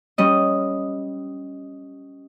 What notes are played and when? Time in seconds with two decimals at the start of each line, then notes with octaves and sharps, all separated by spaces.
0.18 G3 C#4 D#5